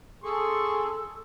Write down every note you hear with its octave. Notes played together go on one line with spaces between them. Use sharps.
G#4 A4 C6 C#6